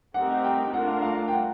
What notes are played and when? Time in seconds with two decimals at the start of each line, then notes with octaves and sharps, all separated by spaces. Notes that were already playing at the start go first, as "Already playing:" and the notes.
0.14 A3 C4 D#4 G4 A#4 F#5
0.30 F#5
0.44 G5
0.73 A3 D4 F4 A#4 F#5
0.88 F5
1.02 F5
1.17 F5
1.28 G5
1.32 F#5